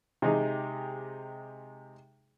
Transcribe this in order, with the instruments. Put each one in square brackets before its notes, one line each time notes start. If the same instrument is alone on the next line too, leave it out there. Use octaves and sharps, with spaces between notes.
[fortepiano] C3 G#3 D#4 G4 G#4